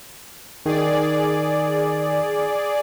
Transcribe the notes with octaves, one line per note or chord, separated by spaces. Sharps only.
D#3 G#4 D5